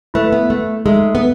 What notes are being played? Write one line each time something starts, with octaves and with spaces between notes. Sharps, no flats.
A3 E4 B4 E5
B3
A3
G#3 D#4 A4 E5
B3